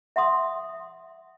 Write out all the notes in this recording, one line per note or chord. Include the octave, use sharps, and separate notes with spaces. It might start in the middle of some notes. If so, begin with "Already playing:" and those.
E5 F#5 C6 D#6